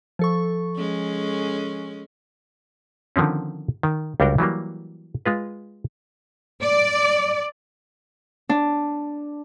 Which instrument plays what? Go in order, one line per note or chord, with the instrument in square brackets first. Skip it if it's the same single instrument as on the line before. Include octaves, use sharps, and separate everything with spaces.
[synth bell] F3 A4 C#6
[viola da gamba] G#3 C#4
[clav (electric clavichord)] D3 D#3 F3 C4 C#4
D#3
C#2 G3 D4 F#4 A#4 G5
E3 F#3 G3 A#3
G#3 F4 B4
[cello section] D5
[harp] D4